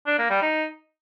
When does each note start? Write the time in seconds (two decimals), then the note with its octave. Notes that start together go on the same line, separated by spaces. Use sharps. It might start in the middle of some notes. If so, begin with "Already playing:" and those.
0.07 D4
0.18 A#3
0.30 G3
0.42 D#4